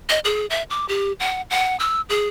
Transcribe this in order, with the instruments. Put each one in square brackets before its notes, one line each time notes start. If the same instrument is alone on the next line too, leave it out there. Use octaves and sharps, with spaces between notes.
[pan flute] D#5
G#4
E5
D6
G4
F#5
F#5
E6
G#4